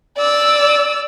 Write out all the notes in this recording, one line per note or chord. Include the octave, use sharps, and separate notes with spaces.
D5 E6